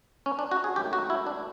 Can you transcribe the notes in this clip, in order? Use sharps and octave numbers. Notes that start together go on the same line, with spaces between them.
C#4
D4
F#4
G#4
G#1 F#2 D#3 F#3 A3 G4
F#4
E4
D4